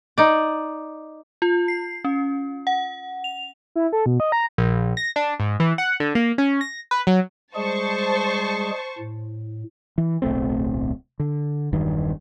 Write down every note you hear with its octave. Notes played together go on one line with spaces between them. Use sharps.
D#4 D5
F4
C7
C#4
F#5
F7
E4
A4
B2
D#5
A#5
A#1
A#6
D4
G#2
E3
F#5
D3
A#3
C#4
A#6
B4
F#3
G3 G#3 G#4 C5 A5 C#6
A2
E3
D1 B1 A3 C4
D3
E1 G2 D#3